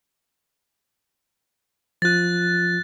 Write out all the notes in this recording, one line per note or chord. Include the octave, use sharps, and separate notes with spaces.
F3 F4 F#6 A6